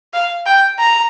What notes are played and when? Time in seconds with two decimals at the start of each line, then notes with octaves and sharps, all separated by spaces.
0.13 F5
0.46 G5
0.78 A#5